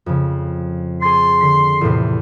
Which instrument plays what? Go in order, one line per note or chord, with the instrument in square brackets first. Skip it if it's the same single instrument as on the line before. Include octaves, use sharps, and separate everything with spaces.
[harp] F2 C#3
[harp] G#4 A6 [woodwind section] C6
[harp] D3 B6
E2 A2 C3